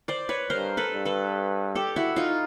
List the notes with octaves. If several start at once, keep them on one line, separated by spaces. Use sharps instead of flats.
C5 D5
B4 C#5
G2 A#4 C5
A4 B4
G2
A4 B4
G4 A4
E4 F#4
D#4 F4